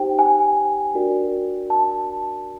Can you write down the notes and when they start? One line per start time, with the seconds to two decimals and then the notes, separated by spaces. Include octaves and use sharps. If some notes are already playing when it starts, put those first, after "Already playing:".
Already playing: D#4 G4 C5 G5
0.19 G#5
0.94 D4 F#4 A#4 D5
1.70 A5